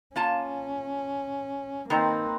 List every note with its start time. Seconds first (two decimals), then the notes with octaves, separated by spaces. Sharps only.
0.16 A#3 C#4 F4 A5
1.90 D#3 A#3 C4 D#4 B4